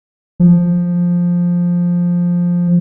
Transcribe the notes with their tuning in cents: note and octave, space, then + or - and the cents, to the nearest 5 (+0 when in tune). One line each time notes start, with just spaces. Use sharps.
F3 +5